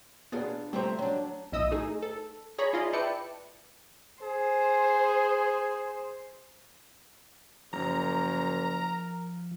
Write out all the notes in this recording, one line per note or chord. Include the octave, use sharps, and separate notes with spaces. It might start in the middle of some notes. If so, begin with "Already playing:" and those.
B3 D4 F4 G#4
G3 A3 C4 C5 E5 A#5
F#3 D4
B1 A2 E4 D#5 D#6 E6
A3 D#4 G#4
A4
G#4 C#5 A#5 B5 C#6
E4 F4 G#4 D5 D#5
E4 B4 D5 G5 A5 C#7
G#4 C5
F#1 F3 A#4 A#5